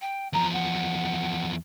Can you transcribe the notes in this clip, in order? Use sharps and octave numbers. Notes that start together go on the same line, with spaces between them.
G5
E2 F3 A#5
F#5